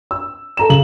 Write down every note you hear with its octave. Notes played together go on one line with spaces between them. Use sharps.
E6
A4 A#5 E7
C#3 F#7